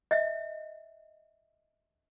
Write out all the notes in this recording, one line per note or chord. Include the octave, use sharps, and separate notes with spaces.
D#5 E5